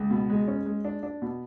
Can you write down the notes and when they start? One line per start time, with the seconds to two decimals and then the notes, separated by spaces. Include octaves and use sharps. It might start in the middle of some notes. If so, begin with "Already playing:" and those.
Already playing: C#2
0.11 B2
0.30 G#3
0.48 C#4
0.66 G#3
0.85 D4
1.03 D4
1.22 B2